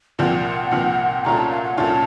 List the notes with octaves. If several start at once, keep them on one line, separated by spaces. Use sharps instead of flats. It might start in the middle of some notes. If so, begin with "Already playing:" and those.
C2 A#2 F3 C4 F#5
C2 A#2 F3 C4
C2 A#2 A3 C#4 F4 A#5
A5
F5
F#5
C2 A#2 A3 C#4 F4 A5